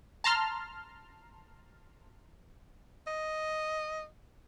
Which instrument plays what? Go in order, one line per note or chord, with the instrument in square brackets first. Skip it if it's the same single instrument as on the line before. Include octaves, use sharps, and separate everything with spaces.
[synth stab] A5 A#5 C6 F6
[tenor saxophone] D#5